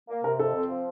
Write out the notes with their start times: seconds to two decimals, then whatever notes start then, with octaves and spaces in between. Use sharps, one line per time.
0.09 A#3
0.24 C3 A#4
0.39 F2 A4
0.54 C4
0.69 F3